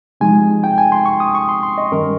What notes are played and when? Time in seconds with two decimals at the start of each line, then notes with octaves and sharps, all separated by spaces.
0.21 C3 F3 G#3 D#4 G#5
0.64 G5
0.78 G#5
0.92 C6
1.06 C#6
1.20 D#6
1.35 C#6
1.49 C6
1.63 C6
1.78 D#5
1.91 G2 D#3 G3 C#4 A#4